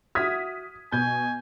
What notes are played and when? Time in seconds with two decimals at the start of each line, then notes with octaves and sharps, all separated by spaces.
0.15 F#4 E5 D#6 F6 G#6 B6
0.92 B2 G#5 G6